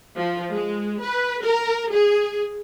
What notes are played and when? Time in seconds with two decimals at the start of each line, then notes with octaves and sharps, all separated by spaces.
0.17 F3
0.53 G#3
1.02 B4
1.43 A#4
1.92 G#4